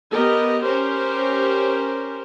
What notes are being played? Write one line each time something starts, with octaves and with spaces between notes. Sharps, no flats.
B3 G4 A#4 D#5
C#4 G4 A#4 C5